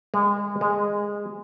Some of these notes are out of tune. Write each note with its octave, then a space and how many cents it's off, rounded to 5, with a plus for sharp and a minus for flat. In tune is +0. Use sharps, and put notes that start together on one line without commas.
G#3 -30
G#3 -15